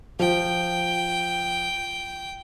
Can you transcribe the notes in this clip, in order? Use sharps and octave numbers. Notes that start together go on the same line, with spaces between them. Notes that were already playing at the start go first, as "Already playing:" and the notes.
F3 G5